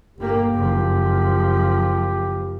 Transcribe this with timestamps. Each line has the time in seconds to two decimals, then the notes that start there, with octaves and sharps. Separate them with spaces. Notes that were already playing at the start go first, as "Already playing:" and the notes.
0.18 G1 A#3 G4
0.54 F#1 F3